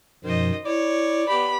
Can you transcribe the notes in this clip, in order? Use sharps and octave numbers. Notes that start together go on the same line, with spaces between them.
F#2 B2 D#3 F3 C5 D#5
E4 C#5 D5
B3 G4 B5